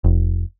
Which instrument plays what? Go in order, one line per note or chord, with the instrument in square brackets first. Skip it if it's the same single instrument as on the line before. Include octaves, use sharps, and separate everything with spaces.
[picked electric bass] F1